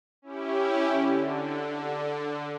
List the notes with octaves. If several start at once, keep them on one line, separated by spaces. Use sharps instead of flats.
C#4 E4 G4
D3